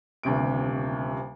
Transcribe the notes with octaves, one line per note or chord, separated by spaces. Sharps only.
D#1 D2 C3 D7